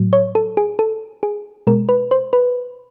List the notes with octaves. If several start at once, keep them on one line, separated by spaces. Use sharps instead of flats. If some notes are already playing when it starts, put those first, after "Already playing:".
Already playing: A2 F#3
C#5
A4
G#4
A4
G#4
B2 G#3 A#4
B4
C5
B4